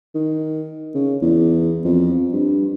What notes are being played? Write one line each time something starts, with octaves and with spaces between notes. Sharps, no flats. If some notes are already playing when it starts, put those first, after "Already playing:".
D#3
C#3
E2
F2
G2